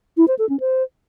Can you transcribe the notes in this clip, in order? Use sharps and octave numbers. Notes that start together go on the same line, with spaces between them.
E4
C5
A4
C#4
C5